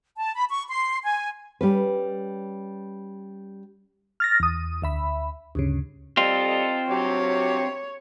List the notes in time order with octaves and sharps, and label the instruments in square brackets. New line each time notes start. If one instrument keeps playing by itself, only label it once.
[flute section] A5
B5
C#6
C6
G#5
[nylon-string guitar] G3 C#4 B4
[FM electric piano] F6 A6 A#6
E2 D#6
D2 E5 B5
D2 G2 C#3
[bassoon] G3 [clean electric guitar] C4 F4 [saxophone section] A4 D#5
[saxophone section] G2 C3 G4 [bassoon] F#3 [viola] C#5